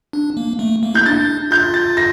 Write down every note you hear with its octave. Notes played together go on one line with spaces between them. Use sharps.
D4
A#3
A3
A#3
E4 G6
D4 A6
F4 G6
A6
A#6